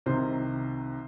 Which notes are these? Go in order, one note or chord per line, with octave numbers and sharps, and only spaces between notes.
C2 C3 D#3 C5